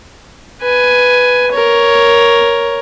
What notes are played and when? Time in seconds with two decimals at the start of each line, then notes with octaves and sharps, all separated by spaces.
0.62 B4 G#5
1.52 A#4 C#5